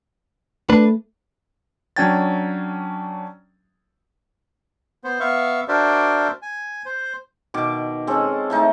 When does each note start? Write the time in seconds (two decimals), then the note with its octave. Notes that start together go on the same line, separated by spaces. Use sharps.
0.70 A3 D4 B4
1.96 F#3 C#4 D4 G5 G#6 A6
5.04 B3 C5
5.20 B3 E5 F5 C#6
5.68 D4 F#4 A#4 C5 D5 E5
6.42 G#5
6.86 C5
7.54 B2 D#3 D6
8.07 G#3 C4 C#4 A4
8.50 E3 A3 D#4